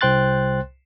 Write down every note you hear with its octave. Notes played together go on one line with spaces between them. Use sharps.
C2 C5 G5 C6 F#6 A6